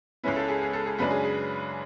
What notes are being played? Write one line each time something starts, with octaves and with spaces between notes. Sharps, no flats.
C#2 C#3 G#3 C#4 E4 B4
A4
G#4
G#4
A4
G#4
F#2 C#3 G#3 D4 B4
G#4
G#4